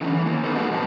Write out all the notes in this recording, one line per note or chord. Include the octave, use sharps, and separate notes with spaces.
D3 E3 C4 C#4
E3
D#3 A#3
A#3 B3 C#4 D#4 A4 B4
G#3 A#3 F#4 G4 D#5 F#5
G2 A#2 F3 C4 B4 A5